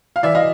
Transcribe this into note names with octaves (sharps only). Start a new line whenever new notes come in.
F5
E3 D5 E5
D#5 F5